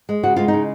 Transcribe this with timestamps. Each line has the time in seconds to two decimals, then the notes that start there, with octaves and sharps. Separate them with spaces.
0.09 G#3
0.23 C#3 F#4
0.36 G#3 F4
0.48 C#3 D#4